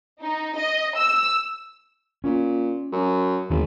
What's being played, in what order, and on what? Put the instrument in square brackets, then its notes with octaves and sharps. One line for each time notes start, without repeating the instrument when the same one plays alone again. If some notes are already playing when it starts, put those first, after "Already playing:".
[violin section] D#4
D#5
E6
[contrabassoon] A#2 [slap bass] C#4
[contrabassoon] F#2
[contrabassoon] G#1 [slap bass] D#2 D3 B3